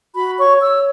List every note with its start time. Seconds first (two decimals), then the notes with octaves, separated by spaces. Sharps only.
0.14 F#4 B5
0.37 C#5 C#6
0.62 C#5 E6